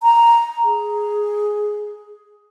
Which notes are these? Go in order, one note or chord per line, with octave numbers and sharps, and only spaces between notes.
A#5
G#4